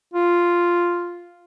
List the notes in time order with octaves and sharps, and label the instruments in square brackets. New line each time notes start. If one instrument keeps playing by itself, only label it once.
[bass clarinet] F4